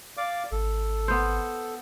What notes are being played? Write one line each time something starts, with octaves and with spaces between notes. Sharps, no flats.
D5 F5 D6
G#1 A4
B3 C5